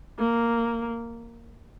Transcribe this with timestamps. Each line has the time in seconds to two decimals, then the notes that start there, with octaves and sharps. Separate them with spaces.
0.19 A#3